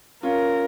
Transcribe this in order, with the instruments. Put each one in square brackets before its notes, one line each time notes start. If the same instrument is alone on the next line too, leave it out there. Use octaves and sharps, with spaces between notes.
[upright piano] C#4 F4 [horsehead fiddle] A#4